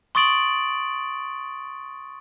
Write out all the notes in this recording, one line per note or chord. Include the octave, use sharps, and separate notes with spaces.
C6 C#6 D#6 A6 D7 F#7